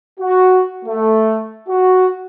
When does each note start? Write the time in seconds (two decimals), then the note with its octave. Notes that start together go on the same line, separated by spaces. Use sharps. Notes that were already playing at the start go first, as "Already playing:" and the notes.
0.20 F#4
0.85 A3
1.68 F#4